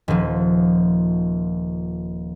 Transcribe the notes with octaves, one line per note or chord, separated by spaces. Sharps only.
D#1 F3